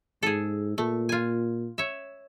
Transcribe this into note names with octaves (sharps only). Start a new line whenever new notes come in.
G#2 G#4 A4
A#2 A3
F4 G#5
C#5 E5